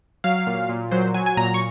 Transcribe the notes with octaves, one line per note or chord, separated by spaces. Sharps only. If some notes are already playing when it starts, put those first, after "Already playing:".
F#3 F5
A#2
A#2
F#3 C5
F#3 G#5
G#5
A#2 A#5
C#6